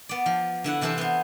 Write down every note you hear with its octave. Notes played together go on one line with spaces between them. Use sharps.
B3 D5
F3
D3 E4 F#5
C3 E3 E4 A4 C5
B3 C5